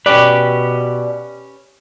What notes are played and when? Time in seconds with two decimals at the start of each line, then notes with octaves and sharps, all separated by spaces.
0.06 B2 C#4 G4 B4 D5